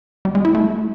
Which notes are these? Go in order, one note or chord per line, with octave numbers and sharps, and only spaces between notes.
G3
G#3
E4
A3